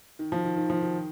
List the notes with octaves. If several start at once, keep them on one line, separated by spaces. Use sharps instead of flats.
D#3
F3
D#3
D#3
F3
D#3